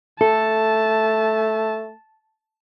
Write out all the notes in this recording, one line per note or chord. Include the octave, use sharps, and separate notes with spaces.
A3 A4 A5